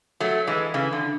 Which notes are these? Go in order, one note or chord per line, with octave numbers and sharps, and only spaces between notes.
F#3 A3
E3 G#3
C#3 E3
D3